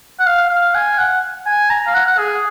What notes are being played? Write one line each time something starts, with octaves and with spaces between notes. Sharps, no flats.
F#5
F5
F5
G#5
F#5
G#5
A#5
F5
F#5
F#5
G#4